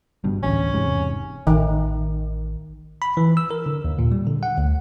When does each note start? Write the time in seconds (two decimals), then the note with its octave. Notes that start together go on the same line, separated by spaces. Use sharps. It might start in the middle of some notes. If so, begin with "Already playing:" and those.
0.24 G1 G2 B2
0.43 A1 D2 C#4
0.73 E1 G#2 C3
1.47 A1 D#3
3.02 B5
3.17 E3
3.37 E6
3.51 A#4
3.66 D3
3.84 D#2
3.99 A#2
4.12 G3
4.27 D3
4.43 F#5
4.58 D2